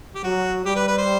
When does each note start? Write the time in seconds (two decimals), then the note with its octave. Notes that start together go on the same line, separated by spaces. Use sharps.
0.15 G4
0.23 F#3 F#4
0.65 G3 G4
0.76 B4
0.88 B4
0.98 C5